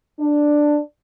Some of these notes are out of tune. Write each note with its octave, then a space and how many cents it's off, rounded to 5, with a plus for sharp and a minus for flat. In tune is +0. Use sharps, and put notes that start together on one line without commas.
D4 +5